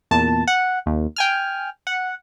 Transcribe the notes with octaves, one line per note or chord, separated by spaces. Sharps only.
E2 A#2 A5
F#5
D#2
G5 G#5 F6
F#5